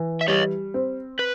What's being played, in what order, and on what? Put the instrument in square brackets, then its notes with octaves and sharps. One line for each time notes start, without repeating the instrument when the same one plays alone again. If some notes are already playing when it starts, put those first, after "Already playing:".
Already playing: [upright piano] E3
[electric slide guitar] E5
[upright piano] G3 [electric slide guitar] C#5 D#5
[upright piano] C4
[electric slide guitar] B4